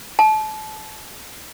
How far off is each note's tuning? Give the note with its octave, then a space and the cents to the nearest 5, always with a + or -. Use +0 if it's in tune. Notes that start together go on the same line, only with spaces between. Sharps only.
A5 -25